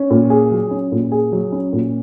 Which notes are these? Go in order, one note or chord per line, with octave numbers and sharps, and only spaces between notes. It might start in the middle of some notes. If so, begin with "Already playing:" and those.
Already playing: C#4
A#2
G#4
F#3
C#4
A#2
G#4
F#3
C#4
A#2